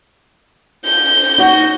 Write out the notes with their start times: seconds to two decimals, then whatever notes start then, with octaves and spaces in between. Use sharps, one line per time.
0.85 G6
1.38 D#4 F#4